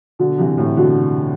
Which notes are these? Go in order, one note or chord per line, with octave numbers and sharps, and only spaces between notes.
B2 D3
C3 E3
A2 C3
B2 D3